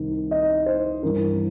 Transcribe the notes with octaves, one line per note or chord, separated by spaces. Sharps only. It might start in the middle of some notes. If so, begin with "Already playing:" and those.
Already playing: C2 C3 D#3
D#5
C5
G2 E3 A#4